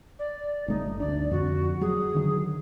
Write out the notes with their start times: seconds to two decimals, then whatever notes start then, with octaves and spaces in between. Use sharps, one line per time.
0.19 D5
0.68 G1 A3 D#4
1.00 D2 D4 D5
1.31 F2 D3 F#4
1.81 F#3 G#4
2.14 D3 D#3 F#3